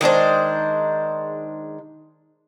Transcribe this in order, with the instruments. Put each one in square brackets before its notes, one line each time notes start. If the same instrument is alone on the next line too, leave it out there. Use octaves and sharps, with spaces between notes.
[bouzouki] D#3 G#3 D4 C5